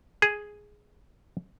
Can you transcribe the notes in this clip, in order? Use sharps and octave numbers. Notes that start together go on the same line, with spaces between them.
G#4